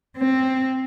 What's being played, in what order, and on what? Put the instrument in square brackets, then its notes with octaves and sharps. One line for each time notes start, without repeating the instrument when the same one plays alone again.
[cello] C4